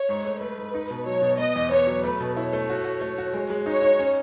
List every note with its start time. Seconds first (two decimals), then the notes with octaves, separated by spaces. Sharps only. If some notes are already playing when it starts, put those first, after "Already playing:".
Already playing: C#5
0.09 G#2
0.25 A3
0.41 A3 B4
0.58 G#2
0.74 D#4
0.90 B2
1.06 F#3 C#5
1.22 B2
1.39 B3 D#5
1.56 E2
1.71 B3 C#5
1.87 F#3
2.03 A3 B4
2.20 B2
2.36 E4 C#5
2.53 A3
2.70 F#4
2.85 F#4
3.01 A3
3.18 F#4
3.33 G#3
3.50 G#3
3.66 D#4 C#5
3.82 D#4
3.99 C#4